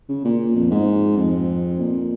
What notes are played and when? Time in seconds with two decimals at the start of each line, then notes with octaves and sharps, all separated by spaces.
0.09 C#3
0.25 A#2
0.56 F2
0.71 G#2
1.17 F2
1.80 A#2